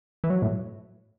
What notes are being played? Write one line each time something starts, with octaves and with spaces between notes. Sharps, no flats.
E3
F#3
A2